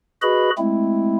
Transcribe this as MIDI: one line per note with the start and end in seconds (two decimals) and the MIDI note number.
0.22 0.50 66
0.22 0.50 68
0.22 0.50 71
0.22 0.50 75
0.22 0.50 83
0.58 1.18 56
0.58 1.18 57
0.58 1.18 60
0.58 1.18 64